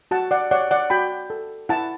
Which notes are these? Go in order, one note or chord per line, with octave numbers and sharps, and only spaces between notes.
F#4 F#5 A5
D5 F#5
C#5 D5 F#5
D5 F#5
F#4 G5 B5
A4
E4 F#5 A5